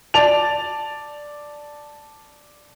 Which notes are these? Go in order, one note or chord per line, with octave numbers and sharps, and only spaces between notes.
D5 A5 F7